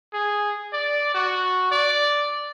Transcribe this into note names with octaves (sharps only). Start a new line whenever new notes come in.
G#4
D5
F#4
D5